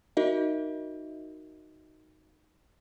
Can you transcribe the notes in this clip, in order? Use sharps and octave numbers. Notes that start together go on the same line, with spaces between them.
D#4 F#4 A#4 D#5 E5